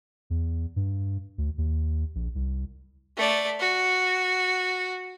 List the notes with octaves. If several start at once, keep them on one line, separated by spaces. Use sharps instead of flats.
E2
G2
D2
D#2
A#1
C2
A3 D5
F#4